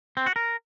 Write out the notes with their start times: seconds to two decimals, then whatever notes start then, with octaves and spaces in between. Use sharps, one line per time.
0.17 C4
0.26 F#4
0.36 A#4